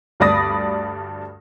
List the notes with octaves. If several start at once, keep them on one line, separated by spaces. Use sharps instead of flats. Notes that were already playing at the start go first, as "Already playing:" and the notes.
D2 G2 D5 B5 D#6 A#6